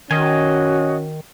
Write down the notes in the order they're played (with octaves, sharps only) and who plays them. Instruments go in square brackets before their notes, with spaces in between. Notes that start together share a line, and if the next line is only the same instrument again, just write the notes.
[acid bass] D#3 [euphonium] C#4 [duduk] F#4 [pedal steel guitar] D#5 G#5